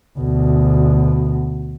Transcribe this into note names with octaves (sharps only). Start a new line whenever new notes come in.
D2 B2